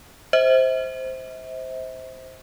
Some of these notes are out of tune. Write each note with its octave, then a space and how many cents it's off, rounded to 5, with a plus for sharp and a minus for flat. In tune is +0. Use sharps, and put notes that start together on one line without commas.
C5 +0 E5 -40